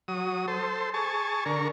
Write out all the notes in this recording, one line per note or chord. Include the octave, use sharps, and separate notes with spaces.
F#3 D#6
A4 C5
G#4 A5 C#6
D3 A#4 C#6